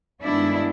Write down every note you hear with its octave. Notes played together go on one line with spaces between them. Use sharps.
G2 D#3 G#3 B3 D4 E4